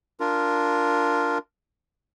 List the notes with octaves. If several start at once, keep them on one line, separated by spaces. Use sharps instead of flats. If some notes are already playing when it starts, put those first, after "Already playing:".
D4 F4 A#4